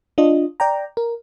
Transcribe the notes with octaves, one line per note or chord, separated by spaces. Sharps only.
D4 F4 D#5
D5 G5 A#5
A#4